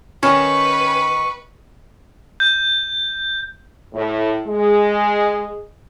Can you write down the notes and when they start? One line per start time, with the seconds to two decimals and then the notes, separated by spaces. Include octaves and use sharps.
0.23 D#3 C#4 B4 C#6
2.40 G6
3.94 A2
4.48 G#3